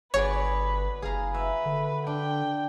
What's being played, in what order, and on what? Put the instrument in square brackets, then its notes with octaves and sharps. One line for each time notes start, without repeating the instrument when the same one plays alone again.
[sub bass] G1 [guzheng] F#4 G#4 D5 [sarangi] B4 [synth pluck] C#5
[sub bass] F#1 [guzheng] G#4 F5 A#5
[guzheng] F#4 E5 [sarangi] B4
[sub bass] D3
[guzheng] D4 [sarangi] G5